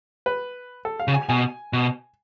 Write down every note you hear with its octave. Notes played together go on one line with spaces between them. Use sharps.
B4
A4
F5
C#3
G#5
B2 G#5
B2